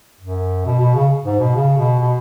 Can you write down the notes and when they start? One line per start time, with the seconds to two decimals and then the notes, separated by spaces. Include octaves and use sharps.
0.21 F#2
0.66 B2
0.79 B2
0.95 C#3
1.25 G#2
1.39 B2
1.55 C#3
1.78 B2
1.99 B2